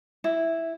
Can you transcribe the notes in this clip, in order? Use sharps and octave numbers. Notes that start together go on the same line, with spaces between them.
E4